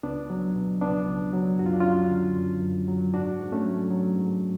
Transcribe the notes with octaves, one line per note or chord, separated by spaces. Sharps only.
C#2 B3 D4
F#3
B2
C#2 B3 D4
C#2
F#3
F#2 F#4
F4
D4
F#3 C#4 F4
D3
F#2
F#2
F#3
G#2 D4 F#4
G#2
A3 C#4
F#3
F#3
G#2